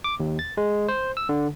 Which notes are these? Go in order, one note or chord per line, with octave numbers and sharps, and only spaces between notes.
D6
D#2
A6
G#3
C5
E6
D3